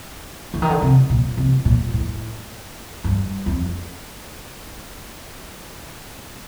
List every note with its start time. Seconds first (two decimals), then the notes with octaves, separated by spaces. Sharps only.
0.54 D3
0.62 D#3
0.70 D3
0.82 C3
1.10 A#2
1.37 C3
1.65 A#2
1.94 A2
3.04 G2
3.46 F2